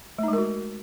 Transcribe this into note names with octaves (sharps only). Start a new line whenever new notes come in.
G#3 A3 D#4 F#4 A#4